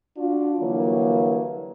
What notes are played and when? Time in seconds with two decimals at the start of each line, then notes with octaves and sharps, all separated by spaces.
0.18 D4 F4 F#4
0.60 D3 E3 F#3 G3 A#3